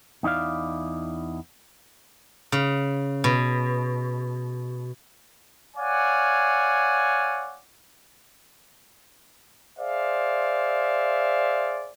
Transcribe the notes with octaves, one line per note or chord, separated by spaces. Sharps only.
E2 D#4 E4 D5 F5
C#3
B2
C#5 D5 F5 F#5 G#5
G#4 C5 D5 E5 F5